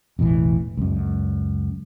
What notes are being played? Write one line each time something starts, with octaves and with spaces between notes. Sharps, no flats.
E1 A1 A2 E3
C#2 F#2